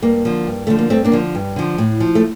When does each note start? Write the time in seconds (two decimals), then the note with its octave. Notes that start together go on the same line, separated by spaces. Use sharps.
0.02 G2 A#3
0.25 D3 F3
0.47 G2
0.67 D3 F3 A3
0.79 A#3
0.90 G2 A3 C4
1.04 A#3 D4
1.12 D3 F3
1.35 G2
1.56 D3 F3
1.78 A2
2.00 F3
2.15 A3